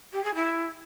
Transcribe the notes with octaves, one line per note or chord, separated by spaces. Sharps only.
G4
G#4
E4